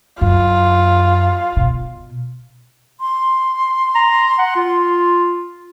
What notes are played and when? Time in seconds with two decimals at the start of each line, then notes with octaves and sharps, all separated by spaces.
0.21 F#2 F4
1.56 B2
3.00 C6
3.95 A#5
4.39 F#5
4.56 F4